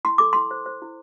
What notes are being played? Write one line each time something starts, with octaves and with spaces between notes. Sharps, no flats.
E4 C6
A4 D6
E4 C6
C5
C5
E4